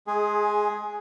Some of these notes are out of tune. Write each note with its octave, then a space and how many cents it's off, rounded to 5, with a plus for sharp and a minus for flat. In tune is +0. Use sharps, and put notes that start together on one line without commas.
G#3 +20 G#4 +0